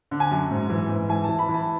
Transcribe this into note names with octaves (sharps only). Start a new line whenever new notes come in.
D3
G#5
F#2
G#2
E3
G#2
E3 G#5
E3 A5
B5
E3
A5